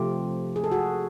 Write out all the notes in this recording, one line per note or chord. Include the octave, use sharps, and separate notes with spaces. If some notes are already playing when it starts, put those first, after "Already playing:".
Already playing: C3 F3 A3 F4 G4
G#4
A4
F#4 G#4